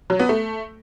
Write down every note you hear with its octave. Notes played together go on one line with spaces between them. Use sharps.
F#3
B3
A3